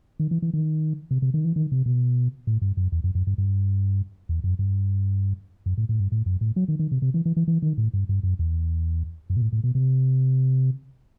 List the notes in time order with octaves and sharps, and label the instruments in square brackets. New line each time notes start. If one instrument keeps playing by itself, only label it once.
[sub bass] D#3
E3
E3
D#3
C3
C3
D#3
E3
D#3
C3
B2
A2
G2
F#2
E2
F#2
F#2
G2
G2
E2
F#2
G2
F#2
A2
A2
G2
A2
F#2
A2
F#3
D#3
D#3
C3
C3
E3
E3
E3
E3
D#3
A2
G2
G2
F#2
E2
F#2
B2
A2
A2
B2
C3